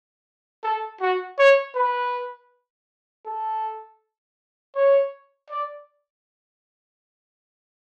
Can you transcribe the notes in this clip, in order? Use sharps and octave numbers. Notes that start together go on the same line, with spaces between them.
A4
F#4
C#5
B4
A4
C#5
D5